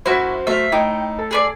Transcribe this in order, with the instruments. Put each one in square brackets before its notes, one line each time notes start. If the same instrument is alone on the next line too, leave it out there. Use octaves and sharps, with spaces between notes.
[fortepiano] F#2 F#3 [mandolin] E4 F#4 [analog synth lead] C5
[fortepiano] F#3 A3 [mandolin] E5 F5
[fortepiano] A2 [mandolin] D#4 [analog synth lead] G5
[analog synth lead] A4
[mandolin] G#4 B4 D5